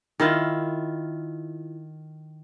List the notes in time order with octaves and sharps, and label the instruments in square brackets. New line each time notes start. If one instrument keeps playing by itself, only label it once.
[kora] D#3 E4 F4